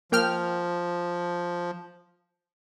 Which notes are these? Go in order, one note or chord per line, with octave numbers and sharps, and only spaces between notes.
F3 A#3 G5 F6